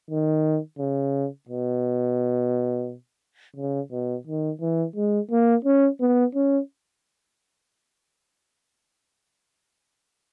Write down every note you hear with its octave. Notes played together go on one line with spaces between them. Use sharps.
D#3
C#3
B2
C#3
B2
D#3
E3
G#3
A#3
C#4
B3
C#4